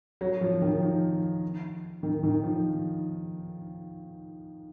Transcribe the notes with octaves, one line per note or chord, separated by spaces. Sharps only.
F#3
F3
D#3
F3
D#3
D#3
F3